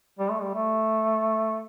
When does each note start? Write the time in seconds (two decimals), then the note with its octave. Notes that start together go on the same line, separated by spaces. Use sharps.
0.19 G3
0.30 A3
0.42 G3
0.54 A3